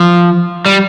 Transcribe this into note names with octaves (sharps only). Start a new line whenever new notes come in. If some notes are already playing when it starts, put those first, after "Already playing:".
Already playing: F3
G3